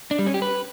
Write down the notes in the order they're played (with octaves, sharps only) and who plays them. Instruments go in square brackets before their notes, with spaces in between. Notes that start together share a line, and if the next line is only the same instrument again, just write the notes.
[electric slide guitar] D4
G3
C#4
G4
B4